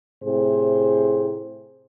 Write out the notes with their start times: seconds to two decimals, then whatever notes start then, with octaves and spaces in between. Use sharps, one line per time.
0.23 A2 C3 G#4 C5